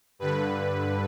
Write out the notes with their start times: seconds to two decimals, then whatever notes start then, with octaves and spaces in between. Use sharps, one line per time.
0.19 G2 D3 B4